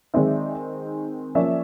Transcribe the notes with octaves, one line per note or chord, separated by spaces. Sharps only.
D#3 G#3 C4 D#4 D5 E5
F3 A#3 C#4 D5 E5